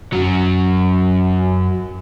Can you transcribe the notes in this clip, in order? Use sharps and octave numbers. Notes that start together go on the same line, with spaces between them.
F#2 F#3